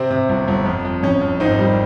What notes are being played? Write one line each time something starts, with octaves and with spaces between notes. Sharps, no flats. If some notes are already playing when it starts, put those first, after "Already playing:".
Already playing: C3 C4
C3
G1
G1
F2
F2
F2 C#4
F2
G#1 C4 D#4
G3